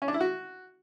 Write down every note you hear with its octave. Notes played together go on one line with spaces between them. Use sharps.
C#4
D4
E4
F#4